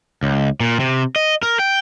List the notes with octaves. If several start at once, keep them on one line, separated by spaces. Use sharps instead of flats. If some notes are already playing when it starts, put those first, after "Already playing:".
C#2
A#2
C3
D#5
A#4
G5